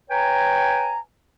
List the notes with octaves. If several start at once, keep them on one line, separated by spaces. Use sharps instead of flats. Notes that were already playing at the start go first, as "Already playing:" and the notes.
B4 C#5 G5 G#5 A#5